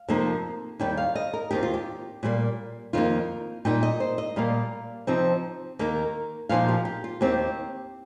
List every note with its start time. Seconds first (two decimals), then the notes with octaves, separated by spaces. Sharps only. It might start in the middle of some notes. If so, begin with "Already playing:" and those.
Already playing: F5
0.08 F2 C3 F3 A#3 D#4
0.79 D#2 D#3 G3 G5
0.97 F5
1.15 D#5
1.33 A#4
1.51 D#2 D#3 C4 G4
1.63 F4
1.74 G4
2.23 A#2 G3 A#3
2.93 F2 D#3 A#3 D#4 F4
3.65 A#2 G3 D#4 G5
3.83 D#5
4.00 C5
4.18 D#5
4.36 A#2 G3 A#3 F5
5.07 C3 F3 C4 D#4
5.79 D#2 D#3 A#3 D#4
6.49 A#2 F3 A#3 D#4 F5
6.68 G4
6.85 G4
7.04 F4
7.21 D#2 D#3 C4 G4